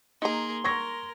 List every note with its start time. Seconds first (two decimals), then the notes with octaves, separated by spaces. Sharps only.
0.22 A#3 D#4 G#4 A#4 A#5 C6
0.64 A#4 C#6 G#6 A#6